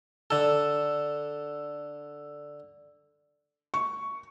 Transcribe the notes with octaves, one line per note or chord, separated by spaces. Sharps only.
D3 A4
C#6